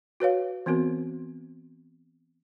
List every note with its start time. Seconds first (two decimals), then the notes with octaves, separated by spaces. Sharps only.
0.20 F#4 B4 C#5 F5
0.66 E3 B3 C4 F#4 A#4